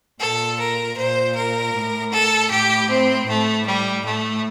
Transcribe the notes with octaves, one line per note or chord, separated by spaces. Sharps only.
A#2 A4
A#4
A#2 C5
A#4
A2
A4
A2 G4
C4
A2 A3
G3
A2 A3